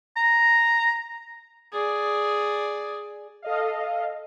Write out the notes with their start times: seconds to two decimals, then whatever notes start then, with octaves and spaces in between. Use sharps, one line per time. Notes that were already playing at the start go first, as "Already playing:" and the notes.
0.17 A#5
1.72 G#4 D5
3.42 A4 D#5 F5